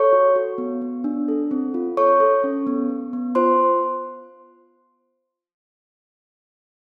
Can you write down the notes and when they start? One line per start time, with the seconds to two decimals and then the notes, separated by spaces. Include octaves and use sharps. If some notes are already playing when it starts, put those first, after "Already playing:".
Already playing: A4 C#5 C#6
0.13 F#4
0.36 F#4
0.58 B3
0.81 B3
1.04 D4
1.28 A4
1.51 C4
1.74 F4
1.97 A4 C#5 C#6
2.20 A4
2.44 C#4
2.67 B3
2.90 B3
3.13 B3
3.35 F4 C5 C6